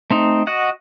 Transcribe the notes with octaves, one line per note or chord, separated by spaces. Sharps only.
A3 C4 D#4
F#4 D#5 F#5